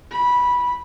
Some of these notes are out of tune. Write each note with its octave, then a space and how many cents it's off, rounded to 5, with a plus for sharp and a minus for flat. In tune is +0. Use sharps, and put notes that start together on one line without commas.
B5 -10